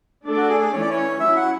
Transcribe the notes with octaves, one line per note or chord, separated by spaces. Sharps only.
A3 D4 A4 D5
F#4
G#4
G#4
E3 A3 C#4 C#5
D5
C#5
F#3 C#4 E4 E5
F#5